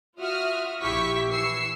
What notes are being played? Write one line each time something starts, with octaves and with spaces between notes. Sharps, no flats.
F4 F#4 E5 D#6 F6
A#1 E4 G4 E5 C#6 B6
E3 E6 C7 C#7